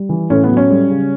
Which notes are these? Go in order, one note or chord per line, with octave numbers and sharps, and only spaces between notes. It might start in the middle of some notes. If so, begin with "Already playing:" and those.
Already playing: G3
E3
A2 C#4
B3
F#3
C#4
G3
C#3